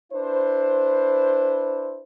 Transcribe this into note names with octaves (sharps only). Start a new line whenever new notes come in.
D4 E4 B4 C5